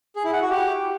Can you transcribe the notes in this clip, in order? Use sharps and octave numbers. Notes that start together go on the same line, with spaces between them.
G#4
E4
F#5
F#4
G4